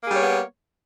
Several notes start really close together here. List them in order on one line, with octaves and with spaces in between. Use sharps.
A#3 G#4 G3 C#5 B3